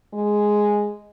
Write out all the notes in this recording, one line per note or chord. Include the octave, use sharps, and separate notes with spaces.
G#3